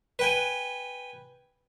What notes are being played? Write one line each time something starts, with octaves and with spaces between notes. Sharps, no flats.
B4 G5 G#5